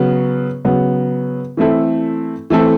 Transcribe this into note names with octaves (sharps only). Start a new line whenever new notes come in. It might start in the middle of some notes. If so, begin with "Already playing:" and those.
Already playing: C#3 F#3 B3
C#3 F#3 B3
E3 A3 C4 E4 A4
E3 A3 C4 E4 A4